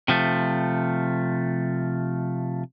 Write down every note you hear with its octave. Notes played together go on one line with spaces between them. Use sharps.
C3 F3 A3